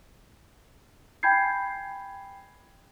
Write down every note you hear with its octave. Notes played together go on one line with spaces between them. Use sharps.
G5 G#5 B5 G6 G#6 C7